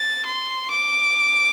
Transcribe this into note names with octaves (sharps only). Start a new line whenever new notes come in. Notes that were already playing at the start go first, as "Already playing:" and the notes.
Already playing: A6
C6
D6